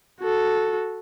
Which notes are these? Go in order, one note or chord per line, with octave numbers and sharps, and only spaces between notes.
F#4 A4